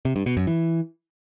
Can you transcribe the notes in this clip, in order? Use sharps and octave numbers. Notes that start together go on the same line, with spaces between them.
C3
G2
B2
F#2
E3